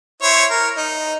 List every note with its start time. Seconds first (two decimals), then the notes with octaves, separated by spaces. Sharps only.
0.22 E4 C5 C#5
0.50 A#4
0.77 D#4